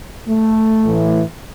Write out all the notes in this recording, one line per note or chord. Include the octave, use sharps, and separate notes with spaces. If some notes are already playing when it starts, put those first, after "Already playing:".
A3
A2 E3